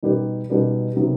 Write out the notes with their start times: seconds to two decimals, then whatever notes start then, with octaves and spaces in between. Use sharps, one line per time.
0.03 B2 G3 D#4 G4 B4
0.50 B2 G3 D#4 G4 B4
0.96 C3 D#3 F#3 B3